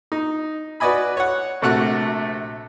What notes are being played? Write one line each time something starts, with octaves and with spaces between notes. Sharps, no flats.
D#4
F#4 B4 D5 D#5 G#5 B5
C#5 F#5
A#1 C3 A3 F#4 F#6